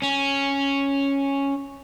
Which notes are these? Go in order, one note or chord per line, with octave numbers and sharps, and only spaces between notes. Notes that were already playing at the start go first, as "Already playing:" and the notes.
C#4